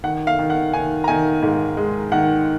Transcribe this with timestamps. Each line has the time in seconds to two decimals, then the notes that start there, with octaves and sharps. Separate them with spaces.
0.04 D#3 F#5
0.27 F5
0.39 D#3
0.50 F#5
0.74 D#3 G#5
1.04 A#5
1.08 D#3 G#5
1.43 G#2
1.77 G#3
2.12 D#3 F#5